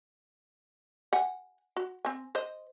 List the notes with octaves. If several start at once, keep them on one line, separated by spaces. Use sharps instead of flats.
F#5 G#5
F#4
C4 G#5
C5 D#5